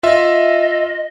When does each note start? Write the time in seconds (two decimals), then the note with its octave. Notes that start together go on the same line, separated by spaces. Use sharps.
0.03 F4 D#5 E5